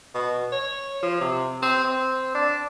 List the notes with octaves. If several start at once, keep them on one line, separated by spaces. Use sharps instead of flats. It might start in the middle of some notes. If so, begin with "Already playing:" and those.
B2
C#5
F3
C3
C4
C4
D4